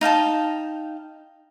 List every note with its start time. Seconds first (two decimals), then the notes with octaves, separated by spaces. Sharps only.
0.01 D#4 F5 G5 A5